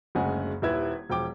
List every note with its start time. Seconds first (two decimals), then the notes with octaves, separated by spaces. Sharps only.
0.15 F#1 D2 C#3 G#3 F#5 G#5
0.62 D#1 D#2 E4 B4 E5 G#6
1.10 E1 F3 G5 D6